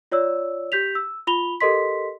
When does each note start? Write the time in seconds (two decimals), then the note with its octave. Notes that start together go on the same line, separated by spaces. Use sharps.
0.12 F4 C#5 D5 E6
0.72 G4 G6 B6 F7
0.95 E6
1.27 F4 B5 F7 G7
1.61 G4 A4 A#4 D#5 C6 B6